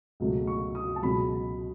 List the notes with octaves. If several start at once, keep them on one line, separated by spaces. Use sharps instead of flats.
C#2 B2 F#3 A3
C#6
D#6
A5
C#2 B2 F#3 B5